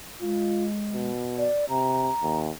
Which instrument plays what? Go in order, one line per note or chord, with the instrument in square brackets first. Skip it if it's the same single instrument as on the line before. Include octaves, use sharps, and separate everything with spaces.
[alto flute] G#3 [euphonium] F4
[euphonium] B2
[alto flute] D5
[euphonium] C3 [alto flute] A#5
[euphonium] D#2